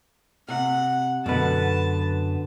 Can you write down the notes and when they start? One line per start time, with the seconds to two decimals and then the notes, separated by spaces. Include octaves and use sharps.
0.48 C3 F#5
1.26 F#2 B2 D3 B4 A5